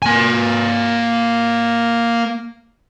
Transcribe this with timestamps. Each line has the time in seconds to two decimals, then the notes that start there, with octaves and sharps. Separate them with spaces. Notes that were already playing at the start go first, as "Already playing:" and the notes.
0.02 A#3 G#5